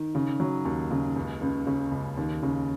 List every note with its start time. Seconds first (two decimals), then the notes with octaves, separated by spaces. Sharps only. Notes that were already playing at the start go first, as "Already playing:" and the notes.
Already playing: D#3
0.15 C#3
0.40 F#3
0.65 D#2
0.91 C#3
1.16 C#2
1.41 C#2
1.67 C#3
1.91 C#2
2.17 D#2
2.43 C#3